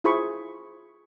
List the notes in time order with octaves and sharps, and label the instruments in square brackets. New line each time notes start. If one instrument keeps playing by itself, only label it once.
[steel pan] E4 F4 G#4 C5 B5 C#6